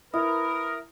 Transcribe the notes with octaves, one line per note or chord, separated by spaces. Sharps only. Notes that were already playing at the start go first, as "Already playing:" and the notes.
E4 A#4 B4 D#6